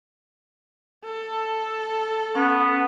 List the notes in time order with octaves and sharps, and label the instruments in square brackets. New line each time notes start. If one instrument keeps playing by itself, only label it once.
[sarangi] A4
[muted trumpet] B3 [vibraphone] C#4